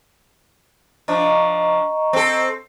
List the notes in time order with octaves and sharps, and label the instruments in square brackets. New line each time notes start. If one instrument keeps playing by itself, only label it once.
[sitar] F3 D4 [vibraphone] D#5 A#5 C#6
[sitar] C4 A4